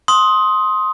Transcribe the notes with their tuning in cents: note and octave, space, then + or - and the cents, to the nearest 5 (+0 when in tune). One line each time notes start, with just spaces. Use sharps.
C6 +10 D#6 +15